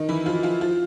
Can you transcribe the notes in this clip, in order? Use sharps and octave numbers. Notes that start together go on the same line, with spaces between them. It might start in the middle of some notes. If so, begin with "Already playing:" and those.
Already playing: D#3 D#4
E3 E4
F3 F4
F3 F4
F3 F4